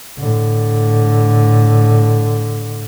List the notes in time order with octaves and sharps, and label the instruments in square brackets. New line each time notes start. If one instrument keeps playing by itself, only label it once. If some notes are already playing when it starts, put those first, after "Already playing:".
[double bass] A2 D3